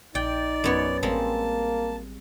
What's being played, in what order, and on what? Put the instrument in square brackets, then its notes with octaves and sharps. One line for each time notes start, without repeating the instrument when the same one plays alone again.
[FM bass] A#1 [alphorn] D#4 [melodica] D5 [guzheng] G5
[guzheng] F#2 B3 C#5
[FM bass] A1 [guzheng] G3 G#3 C4 [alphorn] A#3 [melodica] A5